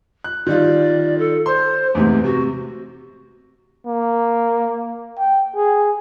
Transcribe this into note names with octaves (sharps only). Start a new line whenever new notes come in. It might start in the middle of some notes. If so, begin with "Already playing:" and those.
F#6
D#3 G3 F4 D5
A4
C5 C6
E2 G#2 C3 A3
C3 F#4
A#3
G5
G#4